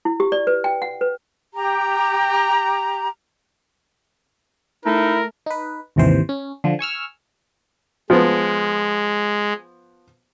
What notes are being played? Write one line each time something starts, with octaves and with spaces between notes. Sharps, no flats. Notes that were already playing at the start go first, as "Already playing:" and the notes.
E4
G4
D5
B4
G5
F#5
B4
G4 A#5
A3 D#4 E4 A4 A#4
D#4 B4
G#1 D#2 C3 E3 C5
C#4
D3 F3
G#5 C#6 E6 F6
F3 G#3 B3